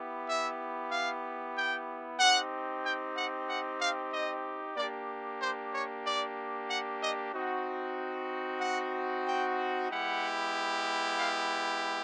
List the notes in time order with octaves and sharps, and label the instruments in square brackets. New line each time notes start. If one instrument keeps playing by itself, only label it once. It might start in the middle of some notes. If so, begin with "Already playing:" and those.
Already playing: [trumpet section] B3 E4 G4
E5
F5
G5
C4 D#4 G4 F#5
G5
F#5
F#5
F5
D#5
A#3 D4 G4 D5
C5
C#5
D5
F#5
D#5
C4 D#4 F#4
F#5
G5
G#3 B3 E4 G4 F#5
F5